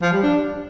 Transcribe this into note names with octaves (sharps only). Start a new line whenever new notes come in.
F3
G3
D4